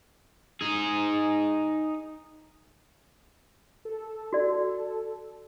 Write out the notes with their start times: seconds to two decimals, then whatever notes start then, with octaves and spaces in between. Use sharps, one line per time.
0.61 D#4 G#4
3.85 A4
4.33 F#4 D5